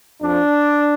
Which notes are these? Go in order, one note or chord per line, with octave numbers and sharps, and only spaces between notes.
F2 F3 D4